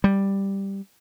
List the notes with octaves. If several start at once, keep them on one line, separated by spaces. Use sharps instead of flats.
G3